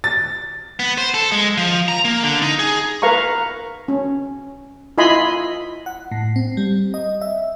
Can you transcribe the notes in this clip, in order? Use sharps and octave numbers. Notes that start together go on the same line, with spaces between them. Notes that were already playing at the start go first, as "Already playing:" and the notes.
A6
B3
C5
A4
G#3
F3
A#5
A#3
D3
D#4
G#4
A#4 B4 F5 A#5 C#6
C#4
E4 F4 D#5 G#5 B5 C6
F#5
A2
C4
G3
D#5
E5